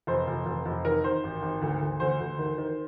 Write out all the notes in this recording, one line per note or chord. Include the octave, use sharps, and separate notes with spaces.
F1 C5
F1
F1
F1
D#3 A#4
D#3 C5
G#1
G#1
D2
D2
D2 C5
D2
D#3
D#3